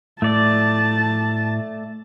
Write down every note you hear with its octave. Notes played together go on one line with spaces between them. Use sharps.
A2 A3 D5 A5